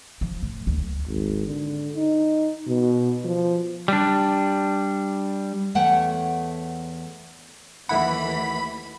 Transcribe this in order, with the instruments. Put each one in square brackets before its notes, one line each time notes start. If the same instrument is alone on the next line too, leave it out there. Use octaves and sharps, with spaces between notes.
[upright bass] F3
A2
D2
[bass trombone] G#1
D3
D#4
B2
F3
[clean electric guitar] G3 D4
[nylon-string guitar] E2 A3 C#5 F#5 G5
[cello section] D#2 E3 [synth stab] A3 E4 F#5 [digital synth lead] B5